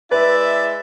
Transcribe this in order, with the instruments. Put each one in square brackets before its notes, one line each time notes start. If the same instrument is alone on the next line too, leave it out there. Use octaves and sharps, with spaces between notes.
[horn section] G#3 E4 E5 [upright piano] B4 [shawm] D5